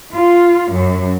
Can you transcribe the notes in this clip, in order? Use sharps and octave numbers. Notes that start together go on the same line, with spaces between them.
F4
F#2